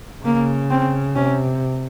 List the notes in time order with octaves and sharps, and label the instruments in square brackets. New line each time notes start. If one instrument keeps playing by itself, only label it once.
[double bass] C#3 [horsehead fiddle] A#3
[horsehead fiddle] C4
[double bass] C3 [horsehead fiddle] C#4